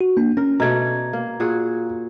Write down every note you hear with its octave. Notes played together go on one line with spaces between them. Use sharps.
F#4
A#3 D4
C#4 A#4
B2 A3 D5 A#5 G#6
A#3
A#2 F#4 G#4